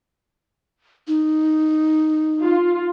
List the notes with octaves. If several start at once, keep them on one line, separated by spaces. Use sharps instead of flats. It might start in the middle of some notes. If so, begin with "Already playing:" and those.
D#4
F4